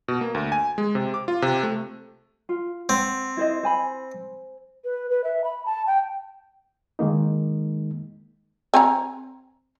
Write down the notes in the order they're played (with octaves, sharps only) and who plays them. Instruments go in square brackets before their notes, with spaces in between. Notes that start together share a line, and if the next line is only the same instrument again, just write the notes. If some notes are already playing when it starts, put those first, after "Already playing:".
[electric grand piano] B2
A#3
D2
G#5
G#3
C3
D6
F4
C3
A3
[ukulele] F4
[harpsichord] C4 [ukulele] F#5
[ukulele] E4 C5 D#5
C5 G#5 B5
[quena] B4
B4
E5
B5
A5
G5
[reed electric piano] D#3 G#3 A#3 D#4
[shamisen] C4 G#5 A#5